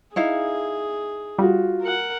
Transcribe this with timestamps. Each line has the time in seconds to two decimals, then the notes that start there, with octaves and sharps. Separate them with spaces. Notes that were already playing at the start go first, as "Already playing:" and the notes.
0.16 D#4 E4 G#4 F5
1.39 G3 F4 F#4
1.82 A#4 F#5